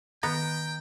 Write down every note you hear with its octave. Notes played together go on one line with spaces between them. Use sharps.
D#3 B3 G5 A#5